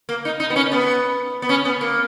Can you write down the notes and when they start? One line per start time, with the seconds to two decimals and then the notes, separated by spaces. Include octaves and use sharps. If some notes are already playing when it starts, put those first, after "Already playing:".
0.09 A#3
0.25 D#4
0.40 D#4
0.50 B3
0.56 C#4
0.72 B3
1.42 B3
1.49 C#4
1.65 B3
1.81 A#3